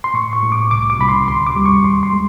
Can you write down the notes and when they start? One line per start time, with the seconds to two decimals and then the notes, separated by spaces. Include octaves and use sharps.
0.04 C6
0.14 A2 C#6
0.33 C#6
0.42 A2
0.52 D6
0.71 C2 D6
0.90 D6
0.99 C2 B5
1.09 C6
1.27 D2 C6
1.46 D6
1.56 G3
1.66 C#6
1.84 D#2 C6
2.03 C6
2.12 G#3